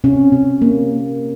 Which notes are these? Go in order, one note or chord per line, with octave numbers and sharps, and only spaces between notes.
C3 C#4
C3
A#3